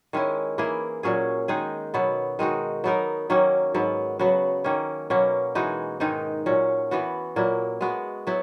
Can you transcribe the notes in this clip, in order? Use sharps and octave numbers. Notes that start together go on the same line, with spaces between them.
D#3 G#3 C#4 E4
E3 A#3 E4 G#4
A#2 F#3 C#4 G#4
D#3 G#3 D#4 G#4
B2 F#3 B3
D#3 G#3 D#4 F#4
F#3 B3 D#4 A#4
D#3 F#3 A#3 C#4
G#2 F#3 B3
C#3 F#3 B3 F#4
D#3 A#3 C#4
B2 F#3 A#3 C#4
E3 G#3 D#4 F#4
G#2 D#3 G#3 D#4
A#2 F#3 C#4
E3 B3 F#4
A#2 F#3 A#3 E4
G#3 B3 F#4
F#3 B3 E4